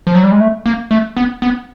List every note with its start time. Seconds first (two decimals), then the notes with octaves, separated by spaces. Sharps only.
0.07 F3
0.15 F#3
0.23 G3
0.32 G#3
0.40 A3
0.66 A#3
0.91 A3
1.17 B3
1.42 B3